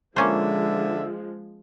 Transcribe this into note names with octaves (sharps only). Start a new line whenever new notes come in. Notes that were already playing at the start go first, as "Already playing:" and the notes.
D3 F3 G#3 A#3 C#4 C5 E5